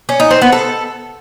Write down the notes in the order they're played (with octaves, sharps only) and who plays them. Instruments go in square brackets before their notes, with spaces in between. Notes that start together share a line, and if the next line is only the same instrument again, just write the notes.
[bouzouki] C#4
D#4
C4
B3
A4